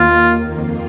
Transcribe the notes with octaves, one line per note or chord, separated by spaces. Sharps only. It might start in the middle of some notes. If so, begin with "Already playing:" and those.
Already playing: D#2 D#3 A#3 F4
F2 D#3 A#3 F4